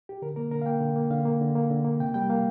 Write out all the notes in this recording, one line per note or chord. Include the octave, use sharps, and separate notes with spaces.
G4
D3 A#4
A#3 A#4
D3 A#4
F5
A#3 G5
D3
A#3
D3 F5
A#3
D3
A#3
D3
A#3
C3 G5
G3 G5
A#3 F5